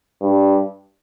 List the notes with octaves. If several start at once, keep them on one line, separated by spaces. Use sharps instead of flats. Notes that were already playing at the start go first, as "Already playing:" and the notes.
G2